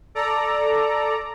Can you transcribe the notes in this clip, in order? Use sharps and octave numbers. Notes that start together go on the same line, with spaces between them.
A4 D5 A#5